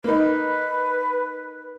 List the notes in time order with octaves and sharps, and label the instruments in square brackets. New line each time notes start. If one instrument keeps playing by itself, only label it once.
[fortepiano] A#3 D#4 [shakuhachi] B4